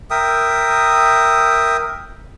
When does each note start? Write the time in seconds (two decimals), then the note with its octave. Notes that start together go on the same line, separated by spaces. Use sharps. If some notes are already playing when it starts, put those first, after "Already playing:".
0.11 A#4 E5 G5 D#6